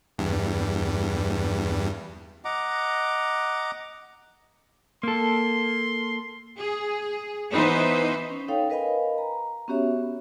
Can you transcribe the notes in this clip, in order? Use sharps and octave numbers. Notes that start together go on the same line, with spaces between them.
E2 G2
D#5 F#5 A#5 D6
A#3 A4 C6
G#4
E3 B3 D#4 B4 C5
C#4
D#4 A4 C#5 F5 G5
A#4 B4 D#5 F5 G#5 B5
A#5
B3 C#4 F#4 G4 C#5 E5